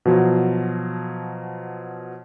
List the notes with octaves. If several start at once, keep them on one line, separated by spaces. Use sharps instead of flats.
B2 F3 F#3